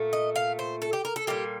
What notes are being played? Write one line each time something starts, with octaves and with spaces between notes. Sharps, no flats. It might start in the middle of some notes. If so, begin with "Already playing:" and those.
Already playing: A#2 A3
D#5
F5
C5
A4
G4
A#4
A4
A#2 G3 G4